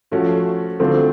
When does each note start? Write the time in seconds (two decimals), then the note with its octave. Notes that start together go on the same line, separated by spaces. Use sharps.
0.11 F3 A3 C#4 F#4
0.80 D3 F#3 A3 C4 F4